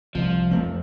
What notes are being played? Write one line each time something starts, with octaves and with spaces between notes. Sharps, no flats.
C2 F3
F2 A3 C4